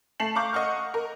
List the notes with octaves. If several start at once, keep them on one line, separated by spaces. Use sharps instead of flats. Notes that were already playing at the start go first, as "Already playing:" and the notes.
A3 A5 C7 F#7
F5 A#5 C#6 D6 G6
D#5 F#5 C#6 F6
A#4